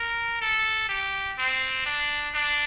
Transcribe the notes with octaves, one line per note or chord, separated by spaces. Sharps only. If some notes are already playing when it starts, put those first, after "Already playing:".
Already playing: A#4
A4
G4
C4
D4
D4